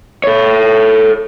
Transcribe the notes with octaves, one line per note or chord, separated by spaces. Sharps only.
A4 C#5